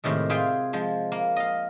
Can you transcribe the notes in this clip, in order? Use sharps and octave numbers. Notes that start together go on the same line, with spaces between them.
A2 C3 D#3 G#3
F4 G#4 E5 F5 G5
F3 G#3
A#3
D#5 F5